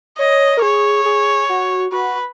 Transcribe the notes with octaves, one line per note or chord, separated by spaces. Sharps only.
C#5 D#5
A#4
G#4 C#5
G#4
F#4
F#4 B4